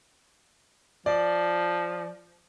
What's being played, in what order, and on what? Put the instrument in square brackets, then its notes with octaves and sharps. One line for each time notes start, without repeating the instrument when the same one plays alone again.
[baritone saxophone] F3 [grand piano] D5